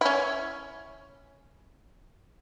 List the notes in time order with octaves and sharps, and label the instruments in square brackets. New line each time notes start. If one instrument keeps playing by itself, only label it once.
[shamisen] C#4 E4